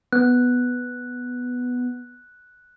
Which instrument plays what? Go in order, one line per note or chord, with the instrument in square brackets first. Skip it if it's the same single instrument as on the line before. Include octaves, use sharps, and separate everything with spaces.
[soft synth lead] B3 [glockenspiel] F#6